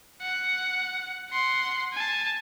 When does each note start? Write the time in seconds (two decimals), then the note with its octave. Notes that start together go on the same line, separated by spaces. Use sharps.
0.22 F#5
1.30 F#5 C6
1.93 G#5 A5